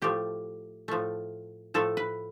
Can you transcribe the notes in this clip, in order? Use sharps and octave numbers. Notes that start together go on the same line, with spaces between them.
A2 F3 A3 G4
A2 F3 A3
A2 F3 A3 A4
B4